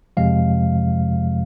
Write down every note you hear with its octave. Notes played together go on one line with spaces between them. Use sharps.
F2 C3 F3 G#3 F5